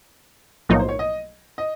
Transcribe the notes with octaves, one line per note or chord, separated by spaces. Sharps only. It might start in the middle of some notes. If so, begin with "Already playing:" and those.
B1 A2 F3 A#3 D#4 C#5
C5
C#5
D#5
D#5